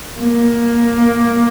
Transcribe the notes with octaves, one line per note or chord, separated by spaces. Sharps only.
A#3